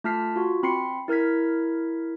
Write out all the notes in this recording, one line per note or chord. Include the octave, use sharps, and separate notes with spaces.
A3 F4 A5 F6 B6 C7
F4 F#4
C4 B5 C6 C7 C#7
E4 A#4 F6 G#6 B6